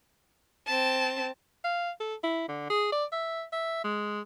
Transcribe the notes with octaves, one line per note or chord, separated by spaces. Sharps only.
C4 A5
F5
A4
E4
D3
G#4
D5
E5
E5
G#3